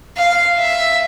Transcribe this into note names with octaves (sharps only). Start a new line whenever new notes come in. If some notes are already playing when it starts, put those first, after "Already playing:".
F5
E5